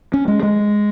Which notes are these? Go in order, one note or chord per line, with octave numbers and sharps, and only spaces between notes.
C#4
G#3
G#3